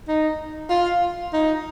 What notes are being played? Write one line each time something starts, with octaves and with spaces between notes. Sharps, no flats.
D#4
F4
D#4